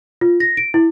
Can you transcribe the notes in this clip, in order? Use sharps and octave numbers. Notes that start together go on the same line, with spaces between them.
F4
A#6
D7
E4